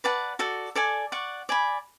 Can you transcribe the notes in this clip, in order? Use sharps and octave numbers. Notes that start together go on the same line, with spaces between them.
B4 D5 F#5 A5
F#4 A4 D5
A4 D5 G#5
D5 F#5 C#6
D5 G#5 B5